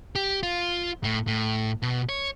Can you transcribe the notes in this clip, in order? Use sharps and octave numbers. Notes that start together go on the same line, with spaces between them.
G4
F4
A2
A2
B2
C#5